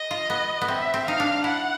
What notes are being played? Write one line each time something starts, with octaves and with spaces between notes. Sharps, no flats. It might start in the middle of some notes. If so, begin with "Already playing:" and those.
Already playing: D#5
F4
B3
B3
C4 E5
C4
D#4 F5
D4
E4 F#5